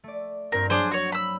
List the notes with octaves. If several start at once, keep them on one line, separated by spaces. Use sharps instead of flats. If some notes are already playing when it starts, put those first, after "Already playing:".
A3 D5
G2 C4 F4 A#4
F#3 A#3 C4 D4 G#4 C5
F#4 C#5
B5 E6